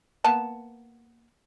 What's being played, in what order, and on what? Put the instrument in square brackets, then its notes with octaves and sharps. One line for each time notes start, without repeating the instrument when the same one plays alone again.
[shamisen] A#3 B3 A5